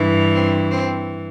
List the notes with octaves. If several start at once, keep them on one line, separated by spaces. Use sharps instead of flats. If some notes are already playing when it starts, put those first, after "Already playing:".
Already playing: G2 E3
C4
C4